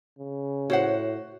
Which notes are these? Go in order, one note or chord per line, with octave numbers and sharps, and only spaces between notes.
C#3
A2 F#4 C5 C#5 F#5